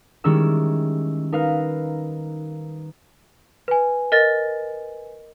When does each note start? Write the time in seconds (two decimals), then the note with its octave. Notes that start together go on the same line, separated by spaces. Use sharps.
0.24 D#3 G3 G#3 C#4 E4 E6
1.32 D#4 A#4 B4 F5
3.68 B4 G#5
4.12 A#4 D#5 A6